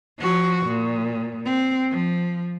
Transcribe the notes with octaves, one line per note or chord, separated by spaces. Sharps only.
F3 F#4
A#2
C4
F3